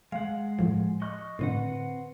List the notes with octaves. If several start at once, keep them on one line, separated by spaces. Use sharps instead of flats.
G#3 F5 F#5
A2 F3
D#5 C#6 F#6
A2 D3 C4 B4 F#5